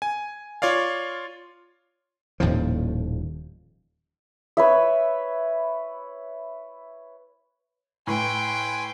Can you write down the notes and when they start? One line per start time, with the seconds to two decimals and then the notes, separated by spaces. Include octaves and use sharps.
0.02 G#5
0.62 F4 C#5 D5 F5
2.40 D#1 D#2 A2 F3
4.57 B4 C#5 E5
8.07 A2 B4 G5 G#5 C6